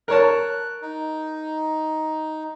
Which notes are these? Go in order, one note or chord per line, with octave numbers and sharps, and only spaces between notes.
A#4 C#5 A5 F#6
D#4